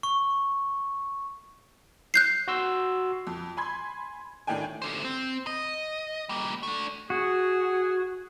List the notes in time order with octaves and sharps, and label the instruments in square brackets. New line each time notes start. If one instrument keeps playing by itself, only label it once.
[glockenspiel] C#6
[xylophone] F#6 G6 C7
[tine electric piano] F#4 C6 E6
[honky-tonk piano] F2
G#5 B5 C6 G#6
A2 D#3 D4 G5 G#5
[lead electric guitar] D3 C5
C4
D#5
G3 A#3
A3 D4
[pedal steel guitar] F#4 [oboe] G#4